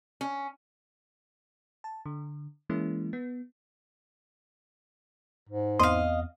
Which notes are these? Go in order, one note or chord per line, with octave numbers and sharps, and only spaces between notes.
C#4
A5
D3
E3 G#3 A#3 C#4 E4
B3
G#2
E2 B3 C4 D#5 F5 C6